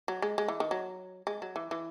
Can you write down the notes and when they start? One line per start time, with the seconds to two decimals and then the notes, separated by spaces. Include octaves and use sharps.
0.08 F#3
0.22 G#3
0.38 G#3
0.48 E3
0.60 D#3
0.71 F#3
1.27 G#3
1.42 F#3
1.56 E3
1.71 E3